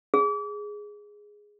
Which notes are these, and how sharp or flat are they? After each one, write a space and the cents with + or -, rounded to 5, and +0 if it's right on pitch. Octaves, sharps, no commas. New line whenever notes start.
G#4 +0